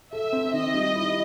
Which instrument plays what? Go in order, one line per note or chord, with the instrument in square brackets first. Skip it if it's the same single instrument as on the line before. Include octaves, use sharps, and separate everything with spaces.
[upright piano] A4 [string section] E5
[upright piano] C4
[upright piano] D#3 [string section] D#5
[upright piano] G3
E4